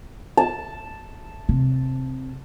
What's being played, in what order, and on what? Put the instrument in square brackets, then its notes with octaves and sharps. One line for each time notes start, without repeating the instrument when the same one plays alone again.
[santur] A5
[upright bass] C3